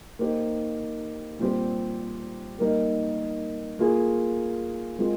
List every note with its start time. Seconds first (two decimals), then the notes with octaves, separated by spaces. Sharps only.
0.19 A#3 D#4 G4 C5
1.39 A#2 G3 C4 G4 C5
2.59 G3 A#3 D#4 A#4
3.79 A#3 F4 G#4
4.99 G#3 C4 F4 A#4